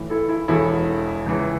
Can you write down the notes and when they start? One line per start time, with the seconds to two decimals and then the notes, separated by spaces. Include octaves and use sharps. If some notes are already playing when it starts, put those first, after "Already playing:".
Already playing: B1 A2 E3
0.10 E4 A4
0.29 E4
0.48 E1 E2 B2 E4 A4
1.26 C#2 C#3 E3